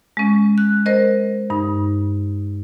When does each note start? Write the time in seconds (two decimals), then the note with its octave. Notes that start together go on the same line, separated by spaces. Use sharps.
0.17 G#3 C#4
0.58 F#6
0.86 A#4 C5 D#5
1.50 G2 D#4